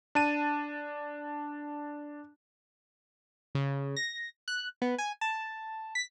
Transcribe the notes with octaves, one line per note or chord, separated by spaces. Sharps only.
D4 A5 D#7
C#3
A#6
F#6
B3
G#5
A5
B6